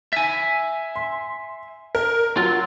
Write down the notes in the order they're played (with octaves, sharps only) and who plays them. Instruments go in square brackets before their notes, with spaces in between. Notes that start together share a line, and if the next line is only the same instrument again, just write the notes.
[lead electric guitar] E5 G#5
[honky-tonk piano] C6
A#4
[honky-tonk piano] F#3 [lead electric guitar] F4